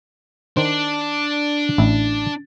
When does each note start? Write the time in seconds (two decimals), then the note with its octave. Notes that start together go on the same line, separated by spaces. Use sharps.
0.57 D#3 D4 C5
1.78 A1 E4